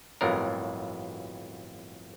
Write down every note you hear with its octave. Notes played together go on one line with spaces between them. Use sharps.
G1 F2 A2 F#3 A#4